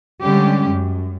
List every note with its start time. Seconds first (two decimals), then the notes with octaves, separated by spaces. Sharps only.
0.22 D3 G3 G#3 C#4 G4
0.66 F#2